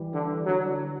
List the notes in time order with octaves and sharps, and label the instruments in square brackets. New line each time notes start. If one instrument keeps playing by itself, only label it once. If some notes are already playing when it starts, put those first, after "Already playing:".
Already playing: [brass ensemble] E3 G3
[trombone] D3
[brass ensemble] D3 [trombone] F#3